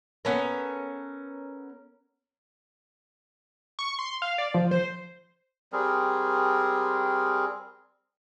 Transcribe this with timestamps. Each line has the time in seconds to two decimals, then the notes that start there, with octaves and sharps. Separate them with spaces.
0.25 B3 C#4 A4 A#4
3.79 C#6
3.99 C6
4.22 F5
4.38 D5
4.54 F3
4.71 C5
5.72 G3 C4 G#4 A#4